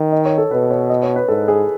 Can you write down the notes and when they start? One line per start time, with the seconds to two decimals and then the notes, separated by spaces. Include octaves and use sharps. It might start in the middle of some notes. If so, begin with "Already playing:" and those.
Already playing: D#3
0.12 D#5
0.26 C#5
0.38 A4
0.51 B2 B4
0.71 C#5
0.90 D#5
1.03 C#5
1.16 B4
1.28 G#2 A4
1.48 G#4